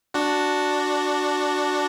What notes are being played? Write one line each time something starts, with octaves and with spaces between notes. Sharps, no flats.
D4 F#4